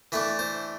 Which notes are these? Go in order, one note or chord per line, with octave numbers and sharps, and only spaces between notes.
E3 A3 D4 E5
C5